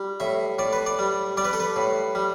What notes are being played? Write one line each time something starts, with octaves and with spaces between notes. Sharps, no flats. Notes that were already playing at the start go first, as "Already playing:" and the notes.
Already playing: G3
A2 E5
A2 D5
B4
D5
G3
G3 D5
B4
A4
B4
A2
G3